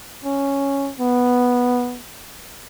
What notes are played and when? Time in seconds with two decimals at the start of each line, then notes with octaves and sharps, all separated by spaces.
0.24 C#4
1.00 B3